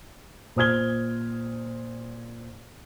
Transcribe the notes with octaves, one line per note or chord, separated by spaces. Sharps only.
A#2 C5 D#6 F6 G#6 G7